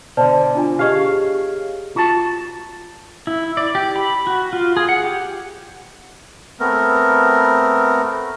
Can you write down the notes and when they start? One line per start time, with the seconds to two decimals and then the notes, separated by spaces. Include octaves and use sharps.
0.17 B2 D3 C5 D5 A5
0.55 D4 F4 G#5
0.79 G4 G#4 C#5 D#5 F5
1.96 F4 F#4 A5
3.27 E4
3.57 D5
3.75 G4
3.96 B5
4.27 F#4
4.53 F4
4.77 G#4
4.89 F#5
5.04 G4
6.60 A3 B3 C4 A#4